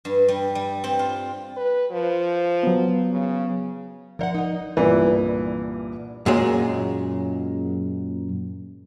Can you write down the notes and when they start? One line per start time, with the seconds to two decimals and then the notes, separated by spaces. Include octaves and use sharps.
0.05 G2
0.28 G3
0.55 G3
0.84 C4
0.99 F4
1.57 B4
1.92 F3
2.63 F#3 B3
3.12 C#3
4.19 F3 A#4 D5 F5 F#5
4.35 D#4 D#5
4.77 C2 G2 A#2 E3
6.26 F#2 A#2 G#3